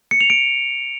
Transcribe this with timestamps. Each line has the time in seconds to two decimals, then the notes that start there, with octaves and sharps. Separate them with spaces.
0.11 C#7
0.21 F7
0.30 D7